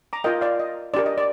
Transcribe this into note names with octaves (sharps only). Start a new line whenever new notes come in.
A#5 D6
F4 A#4 D#5 G5
D5 F5
D#5
D4 G4 A#4 D5
D#5
D5